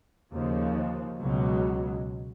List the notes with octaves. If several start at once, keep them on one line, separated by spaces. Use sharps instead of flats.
D#2 C#3 F3
C#2 B2 F#3